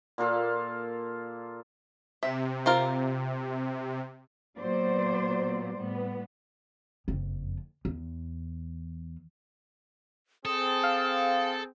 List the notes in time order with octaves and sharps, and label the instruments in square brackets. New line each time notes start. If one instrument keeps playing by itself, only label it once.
[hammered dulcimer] A#2 A#3 F4 A4
[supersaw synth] C3 [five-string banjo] E5
[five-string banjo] C4 F4 A#4
[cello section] A#2 F#3 B3 C5 D5
A2 G3 B3
[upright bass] F#1 F2
E2
[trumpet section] C4 G#4 [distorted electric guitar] A4 [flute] D#6
[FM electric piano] F5